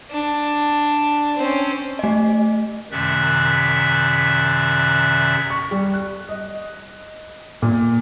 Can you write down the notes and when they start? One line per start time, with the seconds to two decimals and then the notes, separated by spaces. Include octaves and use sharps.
0.11 D4
1.37 C4 C#4
1.99 A3 D#5
2.91 F#2 C3 D#3 D5 E5 F#6
5.50 C#6
5.71 G3
5.94 F#6
6.29 D#5
7.62 A#2